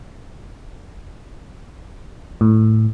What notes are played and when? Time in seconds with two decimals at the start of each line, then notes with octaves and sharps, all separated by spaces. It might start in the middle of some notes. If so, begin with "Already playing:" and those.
2.41 A2